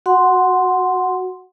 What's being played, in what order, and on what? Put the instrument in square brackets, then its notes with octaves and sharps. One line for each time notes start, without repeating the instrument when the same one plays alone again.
[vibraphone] F#4 F#5 C6